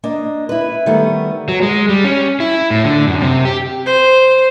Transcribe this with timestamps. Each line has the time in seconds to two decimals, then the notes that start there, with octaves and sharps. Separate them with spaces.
0.03 A#3 D4 D#5
0.49 E4 B4
0.86 D#3 G3 A3 B3
1.48 F#3
1.62 G#3
1.89 G3
2.04 C#4
2.40 E4
2.71 A2
2.84 D3
3.07 F#2
3.21 C3
3.45 G4
3.86 C5